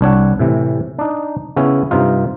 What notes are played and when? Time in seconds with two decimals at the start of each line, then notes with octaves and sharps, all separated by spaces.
0.01 C2 D4 C#5 F#5
0.39 A2 C3 E3
0.99 D4 D#4
1.56 C#3 B3 C#4 E4
1.91 G2 C3 D#4 F4